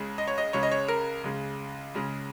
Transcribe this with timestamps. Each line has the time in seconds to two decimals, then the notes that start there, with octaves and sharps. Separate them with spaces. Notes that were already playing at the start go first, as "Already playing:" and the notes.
Already playing: C#2 C#3 G#3
0.18 D#5
0.28 C#5
0.38 D#5
0.53 C#2 C#3 G#3 C#5
0.63 D#5
0.72 C#5
0.88 A#4
1.24 C#2 C#3 G#3
1.94 C#2 C#3 G#3